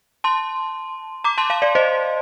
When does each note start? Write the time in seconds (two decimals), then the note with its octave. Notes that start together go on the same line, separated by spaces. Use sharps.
0.24 A5 C6
1.24 A#5 D6
1.38 A5 C6
1.50 F5 A5
1.62 D5 F5
1.75 C5 D#5